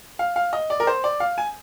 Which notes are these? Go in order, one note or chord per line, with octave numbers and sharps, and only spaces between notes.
F5
F5
D#5
D5
A#4
C5
D5
F5
G#5